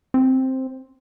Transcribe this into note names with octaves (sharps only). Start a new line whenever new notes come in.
C4